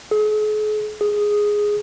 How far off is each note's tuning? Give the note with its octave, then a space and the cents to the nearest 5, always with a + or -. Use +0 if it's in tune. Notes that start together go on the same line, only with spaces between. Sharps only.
G#4 +45
G#4 +0